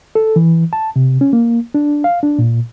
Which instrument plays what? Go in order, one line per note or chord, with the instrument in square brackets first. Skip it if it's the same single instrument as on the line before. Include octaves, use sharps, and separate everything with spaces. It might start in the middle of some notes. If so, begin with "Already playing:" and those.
[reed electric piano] A4
E3
A5
C3
C#4
A#3
D4
F5
D4
A#2